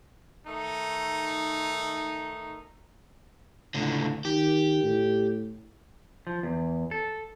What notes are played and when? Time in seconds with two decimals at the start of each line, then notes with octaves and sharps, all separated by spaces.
0.46 D#3 A3 D#4
3.74 C#2 A2 D3
4.25 D#3 G4
4.83 A2
6.27 F3
6.43 E2
6.91 A4